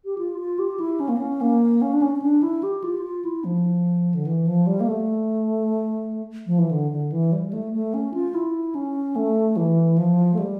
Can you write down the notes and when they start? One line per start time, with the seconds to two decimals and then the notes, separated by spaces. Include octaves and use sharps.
0.05 G4
0.18 F4
0.39 F4
0.59 G4
0.80 E4
1.00 C#4
1.09 A#3
1.17 C#4
1.41 A#3
1.82 C#4
1.93 D4
2.02 C#4
2.16 C#4
2.22 D4
2.43 E4
2.63 G4
2.84 F4
3.04 F4
3.25 E4
3.44 F3
4.14 D3
4.26 E3
4.47 F3
4.67 G3
4.81 A#3
4.87 A3
6.46 F3
6.58 E3
6.71 D3
6.91 D3
7.12 E3
7.33 G3
7.47 G3
7.53 A3
7.73 A3
7.94 C#4
8.14 F4
8.34 E4
8.75 C#4
9.16 A3
9.57 E3
9.98 F3
10.34 A3
10.39 G3